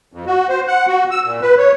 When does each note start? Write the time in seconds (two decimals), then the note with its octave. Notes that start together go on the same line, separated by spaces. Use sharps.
0.13 F2
0.27 F#4
0.49 C5
0.67 F#5
0.88 F#4
1.11 E6
1.25 A#2
1.42 B4
1.58 C#5